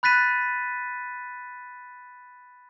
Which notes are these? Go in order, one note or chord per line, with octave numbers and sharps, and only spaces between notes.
B5 F#6 A6 B6 D#7